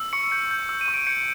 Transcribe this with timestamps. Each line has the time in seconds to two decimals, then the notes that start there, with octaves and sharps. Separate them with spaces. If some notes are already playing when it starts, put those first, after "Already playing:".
Already playing: E6
0.13 C#6 C#7
0.31 G6 C#7
0.51 G6
0.69 E6
0.81 D#7
0.88 C#6
0.94 D7
1.07 G6 C#7